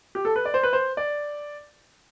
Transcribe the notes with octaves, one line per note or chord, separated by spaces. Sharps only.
G4
A4
B4
D5
C5
B4
C5
D5